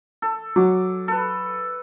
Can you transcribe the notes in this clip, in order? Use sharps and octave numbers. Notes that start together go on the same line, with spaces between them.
A4
F#3 D6
A4 B4